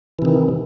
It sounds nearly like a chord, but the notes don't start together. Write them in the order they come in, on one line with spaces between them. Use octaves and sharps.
E3 C3 D#3